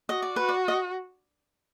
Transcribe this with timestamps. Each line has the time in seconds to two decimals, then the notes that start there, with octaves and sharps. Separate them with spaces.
0.09 F#4 D#5
0.22 D5
0.36 F#4 B4
0.49 D5
0.68 D#5